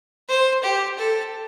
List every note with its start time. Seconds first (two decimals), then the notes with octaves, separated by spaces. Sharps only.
0.28 C5
0.63 G4
0.98 A4